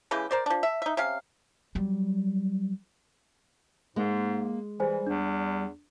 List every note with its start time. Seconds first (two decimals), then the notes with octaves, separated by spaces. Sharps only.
0.11 C#3 E3 G#3 G4
0.31 A#4 C5 D5
0.46 F3 D4
0.63 E5
0.82 D#4 E5
0.97 C3 C#4 F5
1.75 F#3 G3
3.96 G#2 G#3 A#3
4.80 E3 G3 G#4 C5 G#5
5.07 E2 D4